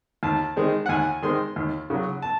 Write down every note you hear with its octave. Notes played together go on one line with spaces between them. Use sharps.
D#2 A5
D#3 G#3 C4
F#5
D#2 G#5
D#3 G#3 C4 C6
D#2
C#3 F#3
A5